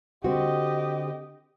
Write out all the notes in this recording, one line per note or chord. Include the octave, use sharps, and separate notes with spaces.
D3 C4 F#4 G4 D#5